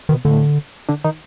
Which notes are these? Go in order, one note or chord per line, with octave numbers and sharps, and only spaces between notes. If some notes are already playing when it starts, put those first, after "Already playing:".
B2 D#3 B3
A2 D3 A3
D3 D4
D#3 D#4